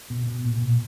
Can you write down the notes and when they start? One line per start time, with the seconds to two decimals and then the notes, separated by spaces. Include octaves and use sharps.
0.10 B2
0.27 B2
0.45 A#2
0.62 A#2